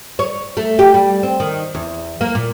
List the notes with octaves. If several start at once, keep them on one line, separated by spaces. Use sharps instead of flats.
C#5
A3
G4
G3
C4
D#3
E2
A#3
A#2